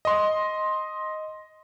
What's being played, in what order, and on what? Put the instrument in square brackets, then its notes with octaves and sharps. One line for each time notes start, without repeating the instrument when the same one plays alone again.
[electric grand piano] D#5 C6